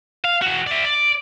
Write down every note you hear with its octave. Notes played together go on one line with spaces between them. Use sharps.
F5
E3 F#4
D5 E5
D5